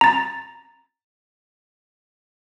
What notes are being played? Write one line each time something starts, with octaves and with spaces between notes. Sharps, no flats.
A#5 A6